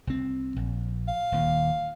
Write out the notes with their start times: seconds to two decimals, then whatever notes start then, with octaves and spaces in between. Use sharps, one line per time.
0.07 C2 C4
0.56 A#1
1.08 F5
1.32 D#1 D#2